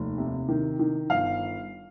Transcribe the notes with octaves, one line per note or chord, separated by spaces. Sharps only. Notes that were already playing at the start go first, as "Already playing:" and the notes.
Already playing: F1 D#2
C3
D#3
D#3
G1 F5